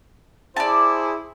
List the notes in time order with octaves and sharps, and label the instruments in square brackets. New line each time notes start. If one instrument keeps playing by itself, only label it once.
[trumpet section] E4 G#4 C5 [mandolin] D5 A5